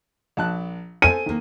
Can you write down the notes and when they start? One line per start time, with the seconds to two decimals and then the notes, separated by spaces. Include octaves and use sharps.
0.37 A#1 A5 F#6
1.02 A4 C5 G#5 D#7
1.26 D#3 A#3